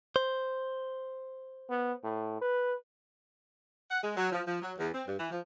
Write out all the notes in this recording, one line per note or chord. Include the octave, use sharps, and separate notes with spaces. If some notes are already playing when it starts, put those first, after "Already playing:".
C5
B3
A2
B4
F#5
G#3
F#3
F3
F3
F#3
E2
C4
G2
E3
F3